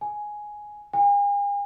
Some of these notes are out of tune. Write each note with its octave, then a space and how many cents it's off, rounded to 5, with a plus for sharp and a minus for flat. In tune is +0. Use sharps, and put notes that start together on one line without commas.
G#5 +5
G#5 -45